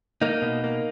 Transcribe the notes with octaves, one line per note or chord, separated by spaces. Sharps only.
A#3 D#4
B2
A#3